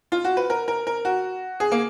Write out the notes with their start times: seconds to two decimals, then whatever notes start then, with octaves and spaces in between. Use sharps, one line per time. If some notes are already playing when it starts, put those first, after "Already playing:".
0.12 F4
0.24 F#4
0.37 B4
0.50 A#4
0.68 A#4
0.87 A#4
1.05 F#4
1.60 G#4
1.72 A#3